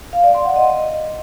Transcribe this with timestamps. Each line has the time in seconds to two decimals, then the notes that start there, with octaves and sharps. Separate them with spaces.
0.13 F5
0.24 D5
0.35 C6
0.45 F#5
0.56 D#5